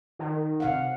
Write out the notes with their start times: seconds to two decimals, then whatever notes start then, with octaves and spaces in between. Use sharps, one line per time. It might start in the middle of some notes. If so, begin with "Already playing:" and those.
0.19 D#3
0.60 C3 F5 F#5